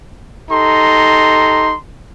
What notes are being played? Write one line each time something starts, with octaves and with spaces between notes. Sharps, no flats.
D#4 G4 A4 A#5 C6